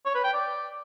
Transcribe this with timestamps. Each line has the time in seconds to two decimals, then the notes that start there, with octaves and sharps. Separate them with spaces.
0.06 C#5
0.15 B4
0.24 G5
0.33 D5